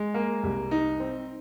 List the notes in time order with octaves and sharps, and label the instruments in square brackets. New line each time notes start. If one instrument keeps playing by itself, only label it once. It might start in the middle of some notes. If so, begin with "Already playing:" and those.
Already playing: [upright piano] G#3
A#3
C2
D#4
C4